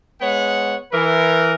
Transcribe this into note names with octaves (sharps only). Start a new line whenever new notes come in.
G#3 B3 C#5 F#5
E3 A#4